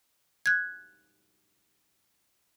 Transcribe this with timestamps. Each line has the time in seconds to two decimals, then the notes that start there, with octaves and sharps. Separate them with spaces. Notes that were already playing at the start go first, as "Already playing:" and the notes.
0.46 F#6 G#6